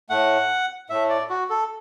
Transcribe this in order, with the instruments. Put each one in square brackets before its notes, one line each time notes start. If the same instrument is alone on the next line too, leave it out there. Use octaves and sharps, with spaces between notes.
[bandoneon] A2 A3 F#5
A2 A3 E5
D5
F#4
A4